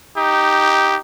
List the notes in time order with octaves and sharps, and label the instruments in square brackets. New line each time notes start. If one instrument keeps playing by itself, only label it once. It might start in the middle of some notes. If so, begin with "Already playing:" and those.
[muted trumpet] D#4 [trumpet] G4